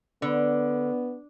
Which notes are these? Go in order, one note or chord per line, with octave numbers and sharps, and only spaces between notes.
D3 B3